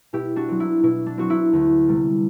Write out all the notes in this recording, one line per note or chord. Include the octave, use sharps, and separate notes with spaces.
B2 E4 G4
D4 F#4
F#3 C4
E4
B2 E4
D4
F#3 C4 F#4
E4
D2
C3 G3 B3